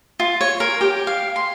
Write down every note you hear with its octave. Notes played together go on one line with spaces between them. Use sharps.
F4
C#5
A#4
G4
F5
C6